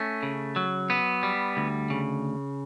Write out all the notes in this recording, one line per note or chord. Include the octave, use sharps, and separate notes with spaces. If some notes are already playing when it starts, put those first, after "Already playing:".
Already playing: A3 C#4
C#3
F#3
B3
G3
D2
C#3